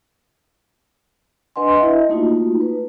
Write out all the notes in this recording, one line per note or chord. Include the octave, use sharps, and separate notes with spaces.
D4 B4 D#5 F#5 G#5 C6
E4 D#5 E5
A3 A#3 D#4 F4 F#4
B4